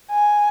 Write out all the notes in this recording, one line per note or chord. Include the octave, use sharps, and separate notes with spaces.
G#5